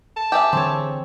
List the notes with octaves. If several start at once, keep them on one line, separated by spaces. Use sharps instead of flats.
A5
G4 G#4 E5
D3 E3 C4 A4 C#5